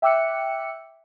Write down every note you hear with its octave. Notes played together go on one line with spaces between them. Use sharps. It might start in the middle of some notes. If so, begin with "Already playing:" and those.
E5 G5 D6 E6 F#6 C#7